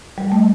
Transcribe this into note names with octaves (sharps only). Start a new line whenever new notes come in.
G3
A3